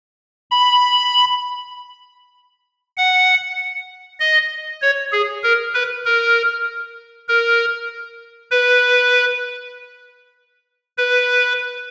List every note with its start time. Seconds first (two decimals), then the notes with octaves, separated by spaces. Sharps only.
0.51 B5
2.97 F#5
4.20 D#5
4.82 C#5
5.12 G#4
5.44 A#4
5.74 B4
6.05 A#4
7.28 A#4
8.51 B4
10.97 B4